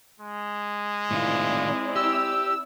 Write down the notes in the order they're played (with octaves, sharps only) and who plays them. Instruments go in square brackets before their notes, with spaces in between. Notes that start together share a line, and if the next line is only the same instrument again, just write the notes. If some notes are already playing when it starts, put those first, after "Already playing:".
[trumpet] G#3
[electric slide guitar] A2 D#3 F4 [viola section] C4 E4 D5
[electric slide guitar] G4 [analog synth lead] E6